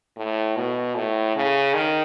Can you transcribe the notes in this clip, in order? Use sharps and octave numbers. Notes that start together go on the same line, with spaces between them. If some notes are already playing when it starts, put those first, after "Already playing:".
A2
B2
A2
C#3
D#3